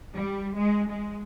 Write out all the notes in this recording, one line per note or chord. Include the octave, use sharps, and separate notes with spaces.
G3
G#3
G#3